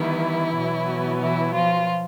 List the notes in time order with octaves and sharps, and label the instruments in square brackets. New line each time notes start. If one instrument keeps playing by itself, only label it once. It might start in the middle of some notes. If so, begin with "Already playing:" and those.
Already playing: [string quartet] D#3 E3 G3 B3 E4
B2 F#3 B3
E3 E4
F3 F4